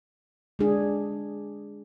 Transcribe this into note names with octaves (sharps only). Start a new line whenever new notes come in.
G#3 D4 G#4